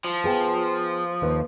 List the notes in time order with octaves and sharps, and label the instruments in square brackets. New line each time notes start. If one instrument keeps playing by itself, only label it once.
[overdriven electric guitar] F3
[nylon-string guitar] B3 G#4 G5
D#2 B4